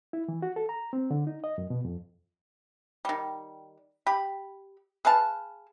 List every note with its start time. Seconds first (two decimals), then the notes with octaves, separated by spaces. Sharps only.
0.13 E4
0.28 E3
0.42 F#4
0.56 A4
0.69 A#5
0.93 C4
1.11 D3
1.27 D#4
1.44 D#5
1.58 F#2
1.70 B2
1.85 F2
3.05 D#3 G3
4.06 G4 B5
5.05 G#4 B4 F5 A5